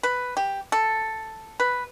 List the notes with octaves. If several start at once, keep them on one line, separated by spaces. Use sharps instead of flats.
B4
G4
A4
B4